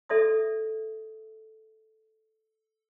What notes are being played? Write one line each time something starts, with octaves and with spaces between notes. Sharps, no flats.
A4 D5 E5 C6 D#6